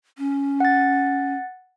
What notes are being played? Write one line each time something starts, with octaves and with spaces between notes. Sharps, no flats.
C#4
F#5 A6